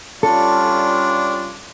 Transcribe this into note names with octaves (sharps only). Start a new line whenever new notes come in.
G3 C#4 D4 F4 A4